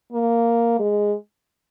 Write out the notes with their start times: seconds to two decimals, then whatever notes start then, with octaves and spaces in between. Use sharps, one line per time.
0.12 A#3
0.79 G#3